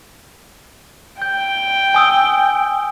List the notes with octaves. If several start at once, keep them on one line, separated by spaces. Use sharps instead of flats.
G5 G6
G#5 D#6 E6